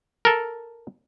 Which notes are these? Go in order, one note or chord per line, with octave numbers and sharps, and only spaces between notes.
A4 A#4